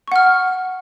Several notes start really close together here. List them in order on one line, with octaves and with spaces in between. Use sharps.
C#6 F#5 F6